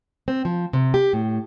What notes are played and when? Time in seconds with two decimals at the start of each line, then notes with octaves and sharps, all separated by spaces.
0.28 C4
0.45 F3
0.73 C3
0.94 G4
1.13 A2